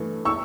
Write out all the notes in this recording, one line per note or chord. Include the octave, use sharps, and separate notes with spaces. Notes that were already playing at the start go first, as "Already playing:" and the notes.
Already playing: G2 E3 A3
C#6 E6